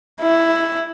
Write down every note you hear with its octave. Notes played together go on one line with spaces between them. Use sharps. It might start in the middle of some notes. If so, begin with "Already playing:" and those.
E4